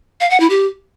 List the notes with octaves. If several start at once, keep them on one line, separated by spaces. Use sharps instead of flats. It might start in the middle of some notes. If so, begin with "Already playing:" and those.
F5
F#5
E4
G4